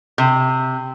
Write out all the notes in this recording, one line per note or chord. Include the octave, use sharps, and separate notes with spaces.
C3